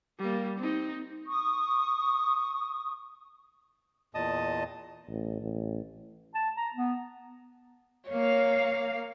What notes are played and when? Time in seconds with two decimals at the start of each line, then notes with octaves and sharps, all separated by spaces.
0.18 G3 A#3
0.59 C4 D#4
1.27 C#6 D#6
4.15 E2 A#2 D#5 A5 D#6
5.09 A1
5.41 A1
6.35 A5
6.57 A#5
6.74 B3
8.10 A#3 C#5 F5